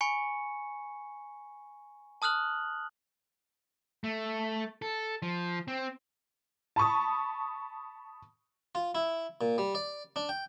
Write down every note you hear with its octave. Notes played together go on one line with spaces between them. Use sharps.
G#5 B5 C#6 C#7
A5 D#6 F6 F#6 F#7
A3
A4
F3
C4
A5 B5 C#6 D#6
F4
E4
A#2
G3
D5
D4
G5